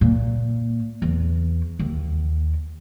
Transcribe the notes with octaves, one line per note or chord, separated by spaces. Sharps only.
A#2
E2
D#2